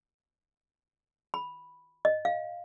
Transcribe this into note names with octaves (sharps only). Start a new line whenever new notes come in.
B5
D#5
F5